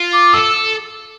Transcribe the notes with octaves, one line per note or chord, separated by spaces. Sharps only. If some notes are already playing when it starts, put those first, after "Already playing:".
Already playing: F4
D6
A4 E6